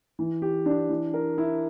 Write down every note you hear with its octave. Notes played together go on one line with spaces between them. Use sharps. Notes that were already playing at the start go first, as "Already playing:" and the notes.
E3
G4
D4
E3
A#4
E4